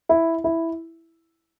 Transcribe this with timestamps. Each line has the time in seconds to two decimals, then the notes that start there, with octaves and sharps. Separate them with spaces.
0.09 E4
0.44 E4